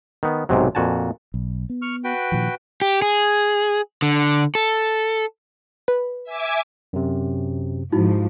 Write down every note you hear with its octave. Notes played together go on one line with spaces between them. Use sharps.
D#3 B3
B1 G#2 C3 F#3
F2 A#2 F#4 G#5 A5
B1
B3
C#6 F6
F#4 B4 G5
A#2 D#3 F3
G4
G#4
D3
A4
B4
E5 G#5 D6
F#2 C3
G#2 F3 D#4 E4 F#4